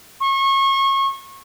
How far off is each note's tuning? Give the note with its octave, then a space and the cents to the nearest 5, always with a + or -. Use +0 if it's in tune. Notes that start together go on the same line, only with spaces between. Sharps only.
C#6 -30